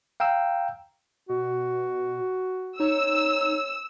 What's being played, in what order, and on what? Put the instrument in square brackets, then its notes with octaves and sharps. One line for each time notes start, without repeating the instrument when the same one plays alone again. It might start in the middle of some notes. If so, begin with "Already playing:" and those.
[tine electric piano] F5 G5 A#5 E6
[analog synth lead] B2 [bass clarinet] F#4
[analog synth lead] D#4 [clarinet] C#5 [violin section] E6